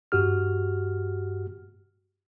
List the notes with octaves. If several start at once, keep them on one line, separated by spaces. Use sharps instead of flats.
G2 F#4 G4 F6